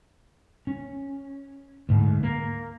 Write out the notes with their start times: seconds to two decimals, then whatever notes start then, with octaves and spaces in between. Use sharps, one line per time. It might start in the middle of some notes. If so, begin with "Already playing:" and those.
0.67 C#4
1.89 D2 G#2
2.23 A#3